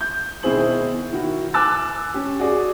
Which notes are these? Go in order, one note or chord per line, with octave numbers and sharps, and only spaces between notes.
G6
B2 D#3 E4 G#4 C5 F#7
D#3 E4 F#4
G#5 A5 D6 E6 F#6 A6
C#4 G4
F#4 G#4 D5